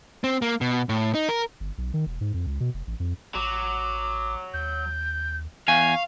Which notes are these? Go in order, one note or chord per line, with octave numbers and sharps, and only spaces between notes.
C4
A#3
B2
A2
D#4
A#4
G1
B1
D#3
E1
G#2
F2
C#2
B2
F1
A1
F2
A1 F#3 D6
D#2 G6
E2 F5 G#5 C#6